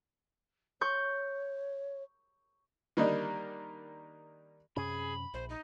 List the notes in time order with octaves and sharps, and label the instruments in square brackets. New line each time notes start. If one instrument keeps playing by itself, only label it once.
[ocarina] C#5 [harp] C#6 G6
[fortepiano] D#3 G3 A#3 D4 D#4
[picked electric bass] F#2 C3 C#4 [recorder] G#4 [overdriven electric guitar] B5
[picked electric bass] A#1 [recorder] C5
[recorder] D#4